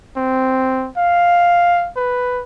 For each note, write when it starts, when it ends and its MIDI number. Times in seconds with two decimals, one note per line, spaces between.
0.16 0.89 60
0.97 1.90 77
1.96 2.42 71